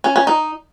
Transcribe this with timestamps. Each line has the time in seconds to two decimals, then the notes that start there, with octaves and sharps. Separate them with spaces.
0.04 C#4
0.16 C#4
0.27 D#4